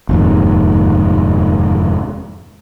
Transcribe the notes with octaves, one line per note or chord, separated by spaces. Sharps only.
F1 D#2 G#2